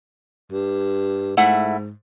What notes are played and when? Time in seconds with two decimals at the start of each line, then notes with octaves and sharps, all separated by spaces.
0.52 G2
1.37 G#2 A3 E4 F#5